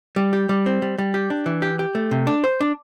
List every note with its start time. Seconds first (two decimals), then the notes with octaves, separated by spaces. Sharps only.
0.16 G3
0.33 G4
0.49 G3
0.66 C4
0.82 G3
0.98 G3
1.14 G4
1.30 D4
1.46 E3
1.62 G4
1.79 G4
1.95 A3
2.11 C3
2.27 D4
2.44 C5
2.61 D4